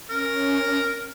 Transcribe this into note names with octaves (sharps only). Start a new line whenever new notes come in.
C#4 A#4